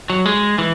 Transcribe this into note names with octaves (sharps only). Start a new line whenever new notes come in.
F#3
G#3
E3